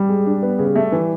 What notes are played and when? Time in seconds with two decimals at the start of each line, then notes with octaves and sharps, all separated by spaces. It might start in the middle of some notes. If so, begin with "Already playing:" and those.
Already playing: G3
0.09 G#3
0.26 D4
0.42 B3
0.59 C#3
0.75 A3
0.92 E3